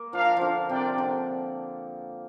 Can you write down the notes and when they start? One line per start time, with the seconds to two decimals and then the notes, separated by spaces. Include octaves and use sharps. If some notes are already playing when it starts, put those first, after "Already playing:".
Already playing: A#3
0.13 F3 D4 A#4 F5
0.37 D3 F3
0.69 C3 D4 A#4 D5 G5
0.98 D3